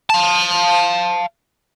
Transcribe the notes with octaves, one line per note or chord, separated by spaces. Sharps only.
F5 A5